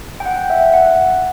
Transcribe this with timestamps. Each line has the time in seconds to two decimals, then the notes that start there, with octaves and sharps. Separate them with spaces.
0.20 G5
0.25 F#5
0.50 E5
0.74 F#5